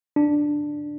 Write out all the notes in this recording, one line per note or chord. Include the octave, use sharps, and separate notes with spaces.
D4